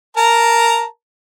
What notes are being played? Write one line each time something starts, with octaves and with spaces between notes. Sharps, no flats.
A#4 A5 A#5